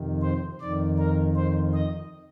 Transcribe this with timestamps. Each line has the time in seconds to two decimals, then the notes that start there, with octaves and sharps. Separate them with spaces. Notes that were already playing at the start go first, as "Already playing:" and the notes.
Already playing: F2 C3 D#3
0.22 C5
0.60 F2 D#3 D5
0.98 A#4
1.36 C5
1.74 D#5